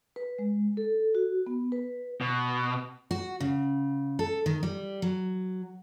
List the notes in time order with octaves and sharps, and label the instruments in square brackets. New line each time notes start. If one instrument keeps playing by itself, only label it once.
[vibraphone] B4
G#3
A4
F#4
B3
B4
[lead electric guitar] B2
[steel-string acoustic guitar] F#4
C#3
A4
D#3
G3
F#3